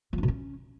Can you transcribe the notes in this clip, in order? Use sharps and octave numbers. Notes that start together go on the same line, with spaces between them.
F3
D4
B2
C#4